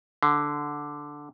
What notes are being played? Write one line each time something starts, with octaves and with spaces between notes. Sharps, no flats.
D3